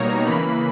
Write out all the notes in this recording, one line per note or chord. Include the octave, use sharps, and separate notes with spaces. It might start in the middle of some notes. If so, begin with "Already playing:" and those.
Already playing: B2 G3 A#3 D#4 C#5 A#5
C#3 E3 A#3 B5